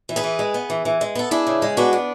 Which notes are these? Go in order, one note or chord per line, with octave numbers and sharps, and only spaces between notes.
E3
G#4 B4
E3
G#3
B3
E3
E3
G#3
B3 A4
D4 E4 G#4
C#3
G#3
B3 D4 F#4
D4